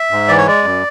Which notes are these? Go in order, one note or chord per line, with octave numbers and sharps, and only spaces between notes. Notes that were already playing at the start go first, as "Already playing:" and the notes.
Already playing: E5
G#2
E3 D5
C#5
G#3 D5
F#2